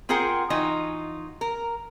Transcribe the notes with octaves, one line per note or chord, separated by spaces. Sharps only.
C4 F4 G#4 A#4 F#5 G5
E3 D#4 F4 F#4
A#4